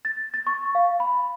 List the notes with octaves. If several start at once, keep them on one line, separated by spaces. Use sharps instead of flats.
A6
A6
C#6
F5
B5